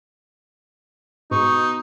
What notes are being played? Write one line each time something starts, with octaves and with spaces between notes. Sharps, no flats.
G#2 B2 D#4 C#6